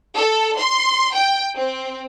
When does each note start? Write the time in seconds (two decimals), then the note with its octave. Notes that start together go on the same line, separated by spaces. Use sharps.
0.16 A4
0.60 C6
1.15 G5
1.56 C4